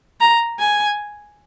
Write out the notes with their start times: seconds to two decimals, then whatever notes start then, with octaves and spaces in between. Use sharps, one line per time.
0.21 A#5
0.59 G#5